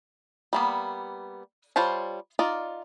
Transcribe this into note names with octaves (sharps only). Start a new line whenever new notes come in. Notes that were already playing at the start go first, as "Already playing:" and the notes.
G3 A#3 B3
G3 F4 C5 C#5 A5
D#4 F4 D5